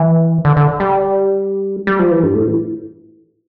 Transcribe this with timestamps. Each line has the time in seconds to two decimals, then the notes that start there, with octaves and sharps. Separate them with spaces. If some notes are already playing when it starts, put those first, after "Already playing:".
Already playing: E3
0.45 D3
0.57 D3
0.80 G3
1.87 G3
1.99 F3
2.11 E3
2.24 G2
2.35 A2
2.47 E3